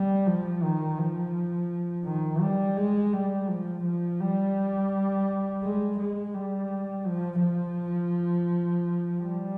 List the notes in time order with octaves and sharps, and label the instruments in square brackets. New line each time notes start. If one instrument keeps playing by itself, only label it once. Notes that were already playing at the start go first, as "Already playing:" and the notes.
Already playing: [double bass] G3
F3
D#3
F3
D#3
G3
G#3
G3
F3
F3
G3
G#3
G#3
G3
F3
F3
G3